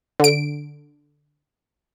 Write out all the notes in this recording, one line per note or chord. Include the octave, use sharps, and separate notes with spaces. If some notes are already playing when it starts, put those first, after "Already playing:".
D3 D7